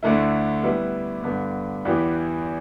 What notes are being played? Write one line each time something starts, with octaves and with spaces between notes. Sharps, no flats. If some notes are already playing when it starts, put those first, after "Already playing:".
D2 D3 A3 E4
G3 B3 E4 B4
G2 D3 B3
E2 E3 B3 G4